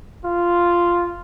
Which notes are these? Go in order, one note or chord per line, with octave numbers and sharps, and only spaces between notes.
F4